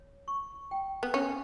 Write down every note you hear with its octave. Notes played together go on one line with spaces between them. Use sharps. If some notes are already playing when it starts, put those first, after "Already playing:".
Already playing: C#5
C#6
G5
B3
C#4 D4